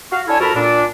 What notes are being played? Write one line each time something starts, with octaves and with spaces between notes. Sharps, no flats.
F#4 F5
D4 E4 A4 C#5 G#5 A5
F2 F#4 A4 A#4 A5 B5
A#2 D4